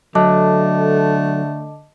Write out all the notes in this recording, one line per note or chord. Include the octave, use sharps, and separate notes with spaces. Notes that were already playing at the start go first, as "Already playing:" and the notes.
D3 F#3 A3 D#5 A5 D6